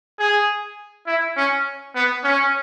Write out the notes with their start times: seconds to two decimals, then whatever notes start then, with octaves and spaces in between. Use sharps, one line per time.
0.19 G#4
1.07 E4
1.37 C#4
1.95 B3
2.24 C#4